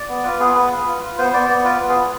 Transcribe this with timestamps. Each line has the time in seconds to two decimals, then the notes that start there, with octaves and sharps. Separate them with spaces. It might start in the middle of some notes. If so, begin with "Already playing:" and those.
Already playing: D5
0.09 B3
0.24 F4 B4
0.40 B3 G#4
0.55 B3 B4
0.71 F4
0.86 F4
1.02 F4
1.18 B3 C5
1.33 B3 D5
1.49 B3 D5
1.64 F4 B4
1.80 B3
1.88 G#4
1.96 F4